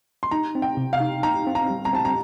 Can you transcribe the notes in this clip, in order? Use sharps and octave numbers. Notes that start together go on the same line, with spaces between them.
C6
D#4 A#5
C4
G5
C3
F5
D#4
D#4 A#5
C4
A#5
G3
A#5
C4 A5
A#5